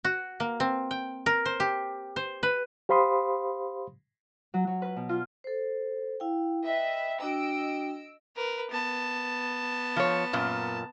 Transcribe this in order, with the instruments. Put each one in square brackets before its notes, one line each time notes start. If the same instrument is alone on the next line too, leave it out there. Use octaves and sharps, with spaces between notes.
[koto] F#4
A#3
C4
G5
A#4
C5
G4
C5
B4
[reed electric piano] G4 C5 F5 B5 C6 D#6
[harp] F#3
F#3
B4
B2
F4
[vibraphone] A4 C5
E4 F5 G5
[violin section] B4 D#5 E5 [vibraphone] G5
[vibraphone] D4 F#4 G5 [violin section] D#5 E6 D7
[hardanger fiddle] A#4 B4
B3 A5
[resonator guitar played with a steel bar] F3 C#5
F#2 A#2